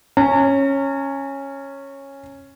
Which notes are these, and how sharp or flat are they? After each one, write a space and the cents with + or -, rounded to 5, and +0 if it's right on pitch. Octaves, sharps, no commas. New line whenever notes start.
C#4 -10 A#5 -45